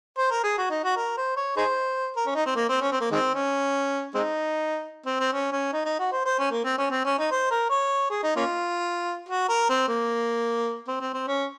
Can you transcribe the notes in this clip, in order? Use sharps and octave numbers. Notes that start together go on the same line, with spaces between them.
C5
A#4
G#4
F#4
D#4
F#4
A#4
C5
C#5
D#4 G#4 C5
A#4
C#4
D#4
C4
A#3
C4
C#4
C4
A#3
D#3 G#3 C4
C#4
G#3 C4 D#4
C4
C4
C#4
C#4
D#4
D#4
F#4
C5
C5
C#4
A#3
C4
C#4
C4
C#4
D#4
C5
A#4
C#5
G#4
D#4
A#3 C#4 F4
F#4
A#4
C4
A#3
C4
C4
C4
C#4